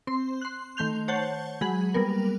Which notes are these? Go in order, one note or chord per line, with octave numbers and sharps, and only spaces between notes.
C4 C6
C6 F#6
D#3 A3 C6 G6 F7
C5 C#5 F#5 A5 G6
F#3 G#3 G#4 B5 F#7
G3 A#3 B3 A#4